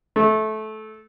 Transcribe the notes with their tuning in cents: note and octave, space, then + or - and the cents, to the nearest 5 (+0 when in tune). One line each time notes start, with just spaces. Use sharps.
A3 -20